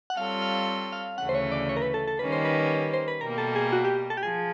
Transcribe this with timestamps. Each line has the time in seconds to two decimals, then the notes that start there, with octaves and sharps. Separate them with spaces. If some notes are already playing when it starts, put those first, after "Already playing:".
0.10 F#5
0.16 G3 C4 F4 A4 C#5 F5
0.42 F5
0.93 F5
1.18 D2 C#3 E3 A3 C#4 F#5
1.29 C5
1.35 C#5
1.52 D5
1.69 C#5
1.77 A#4
1.82 B4
1.94 A4
2.08 A4
2.19 D#3 G3 A#3 C#4 B4
2.32 C5
2.45 B4
2.94 C5
3.08 B4
3.21 B2 G3 A#3 A#4
3.38 A4
3.56 G#4
3.73 F#4
3.85 G4
4.10 A4
4.17 G4
4.23 F3 G#4